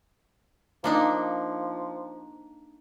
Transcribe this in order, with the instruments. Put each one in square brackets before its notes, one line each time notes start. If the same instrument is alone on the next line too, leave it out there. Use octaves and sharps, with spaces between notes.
[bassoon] F3 [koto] A#3 D4 D#4